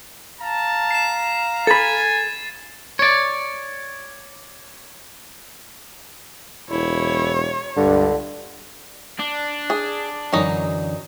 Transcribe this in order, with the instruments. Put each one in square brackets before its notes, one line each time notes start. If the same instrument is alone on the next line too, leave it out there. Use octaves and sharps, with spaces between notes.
[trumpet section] F5 A#5 [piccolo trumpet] A5
[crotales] C7 E7
[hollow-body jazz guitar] A4 B5 [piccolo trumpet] G#5 [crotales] A6
[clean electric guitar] C#5 D5
[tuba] E1 [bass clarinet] E4 [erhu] C#5
[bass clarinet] C#2 [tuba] G2 [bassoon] D3
[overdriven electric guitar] D4
[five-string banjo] G#4
[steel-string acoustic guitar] F#2 D3 E3 [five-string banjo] F#3 D#4